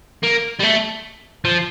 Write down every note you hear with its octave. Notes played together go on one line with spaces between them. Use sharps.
A#3
G3
A3
F3